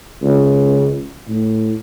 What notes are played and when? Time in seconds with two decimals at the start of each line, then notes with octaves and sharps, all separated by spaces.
0.22 C#2
1.29 A2